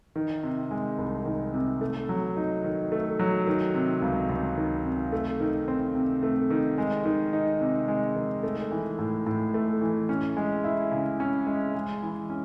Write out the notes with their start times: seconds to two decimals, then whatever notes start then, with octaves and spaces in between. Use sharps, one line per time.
0.16 D#3
0.43 C3
0.71 G#3
0.98 C2
1.25 D#3
1.54 C3
1.81 A3
2.09 F#3
2.37 D#4
2.64 D#3
2.92 A3
3.19 F#3
3.47 D#3
3.74 C3
4.02 C#2
4.29 C#2
4.57 D#3
4.85 C3
5.12 A3
5.40 D#3
5.68 C4
5.95 C3
6.23 A3
6.50 D#3
6.78 G#3
7.05 D#3
7.33 D#4
7.61 C3
7.88 G#3
8.16 D#3
8.43 A3
8.72 E3
8.99 A2
9.27 A2
9.54 A3
9.81 E3
10.09 C#4
10.37 G#3
10.64 E4
10.91 C#3
11.20 C#4
11.47 G#3
11.75 G#3
12.02 E3
12.30 C#4